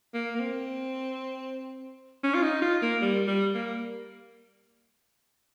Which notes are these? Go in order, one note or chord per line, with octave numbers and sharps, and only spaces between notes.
A#3
A#3
C4
C#4
F4
D#4
F4
A#3
G3
G3
A#3